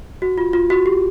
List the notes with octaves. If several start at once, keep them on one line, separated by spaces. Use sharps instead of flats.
F#4
F4
F4
F#4
G4